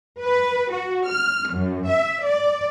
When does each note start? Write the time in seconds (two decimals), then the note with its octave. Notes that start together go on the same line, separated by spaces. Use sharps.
0.21 B4
0.73 F#4
1.09 F6
1.52 F#2
1.88 E5
2.24 D5